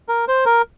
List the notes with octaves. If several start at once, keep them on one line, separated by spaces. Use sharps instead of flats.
A#4
C5
A#4